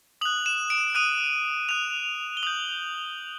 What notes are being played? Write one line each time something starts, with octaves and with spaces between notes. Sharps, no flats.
D#6 F#6 F#7
E7
D7
D#6 F#6 D#7
D#6 F#6 F7
G7
D#6 G6 F#7